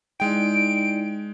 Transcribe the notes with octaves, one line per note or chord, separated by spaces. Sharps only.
G#3 D#4 E4 D5 G5 D7